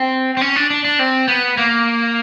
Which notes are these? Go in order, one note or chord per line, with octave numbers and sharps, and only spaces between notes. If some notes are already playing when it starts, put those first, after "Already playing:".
Already playing: C4
C4
C#4
D4
D4
D4
C4
B3
A#3